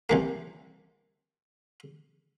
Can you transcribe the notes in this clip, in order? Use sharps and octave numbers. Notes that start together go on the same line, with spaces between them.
C2 E3 A#3